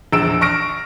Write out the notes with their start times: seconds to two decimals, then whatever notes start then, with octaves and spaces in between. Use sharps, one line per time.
0.13 A#1 E2 E6 D7 E7
0.41 C#6 F6 A#6 D7